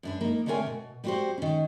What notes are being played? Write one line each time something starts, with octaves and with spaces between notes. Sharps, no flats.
F#2 D4 B4
A#3 D#4
D3 A3 C4 A#4 C#5 G#5
B2
G3 B3 C4 F#4 G4 C5
D#3 C#4